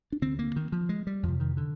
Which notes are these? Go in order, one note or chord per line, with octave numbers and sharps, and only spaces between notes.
D4
D2 D3 C4
A#3
D#3
F3
G#3
G3
F2 C3 F3
D#3
D3